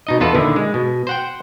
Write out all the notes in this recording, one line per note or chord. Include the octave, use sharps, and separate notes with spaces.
B2 D#4 D#5
E2 B3 F4 A4 B4
A#2 D3 D#3 E4
G#3
B2
C5 F#5 G5